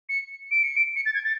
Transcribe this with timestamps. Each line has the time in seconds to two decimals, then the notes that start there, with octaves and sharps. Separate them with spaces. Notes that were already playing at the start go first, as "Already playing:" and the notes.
0.09 C#7
0.51 D7
0.63 C#7
0.76 D7
0.96 C#7
1.05 A6
1.14 G#6
1.24 A6